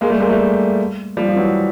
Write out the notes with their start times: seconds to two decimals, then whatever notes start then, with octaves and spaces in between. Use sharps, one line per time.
0.01 G#3 A#3
0.10 G3 A3
0.20 G#3 A#3
0.29 G3 A3
1.17 F3 G3
1.29 F3
1.36 E3 F#3